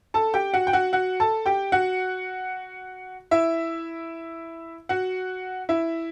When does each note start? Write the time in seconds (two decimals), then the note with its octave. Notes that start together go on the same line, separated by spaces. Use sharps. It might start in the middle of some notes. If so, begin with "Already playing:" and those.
0.14 A4 A5
0.34 G4 G5
0.54 F#4 F#5
0.67 G5
0.73 F#4 F#5
0.93 F#4 F#5
1.20 A4 A5
1.46 G4 G5
1.72 F#4 F#5
3.31 E4 E5
4.89 F#4 F#5
5.69 E4 E5